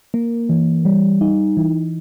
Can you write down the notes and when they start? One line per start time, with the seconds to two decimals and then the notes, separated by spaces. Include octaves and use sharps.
0.14 A#3
0.49 E3
0.85 G3
1.21 D#4
1.57 E3